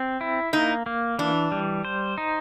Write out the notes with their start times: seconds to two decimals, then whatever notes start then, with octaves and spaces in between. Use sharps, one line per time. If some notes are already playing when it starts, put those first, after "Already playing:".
Already playing: C4
0.21 E4
0.53 A#3 D#4
0.86 A#3
1.19 E3 D4
1.52 G3
1.85 C5
2.18 D#4